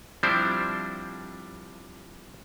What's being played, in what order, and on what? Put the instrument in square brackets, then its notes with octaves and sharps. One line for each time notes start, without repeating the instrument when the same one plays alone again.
[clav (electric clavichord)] F3 G3 C4 D4 E4 C5